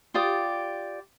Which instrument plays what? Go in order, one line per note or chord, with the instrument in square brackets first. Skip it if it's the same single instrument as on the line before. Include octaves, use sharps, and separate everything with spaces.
[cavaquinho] F4 G4 D5 D#6